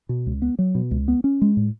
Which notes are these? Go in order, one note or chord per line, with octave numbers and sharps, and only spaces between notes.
B2
C#2
B3
F#3
B2
C#2
B3
C#4
G#3
A2